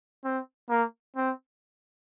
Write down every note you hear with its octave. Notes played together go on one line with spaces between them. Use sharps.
C4
A#3
C4